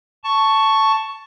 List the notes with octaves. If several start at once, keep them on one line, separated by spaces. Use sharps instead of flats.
A5 C#6